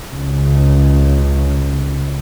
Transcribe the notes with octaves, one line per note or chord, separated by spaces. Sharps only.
C#2 C#3